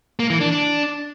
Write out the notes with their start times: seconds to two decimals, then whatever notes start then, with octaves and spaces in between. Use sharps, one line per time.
0.19 A#3
0.30 E3
0.41 D4
0.51 D4